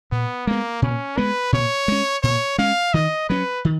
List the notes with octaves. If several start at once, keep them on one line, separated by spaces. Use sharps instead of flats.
A#2 B3
G#3 A#3 B3
A#2 C#4
G#3 B3 B4
A#2 C#5
G#3 C#4
A#2 C#5
G#3 C#4 F5
D#3 D#5
F#3 C#4 B4
D#3